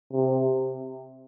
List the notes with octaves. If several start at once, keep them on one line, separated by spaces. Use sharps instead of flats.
C3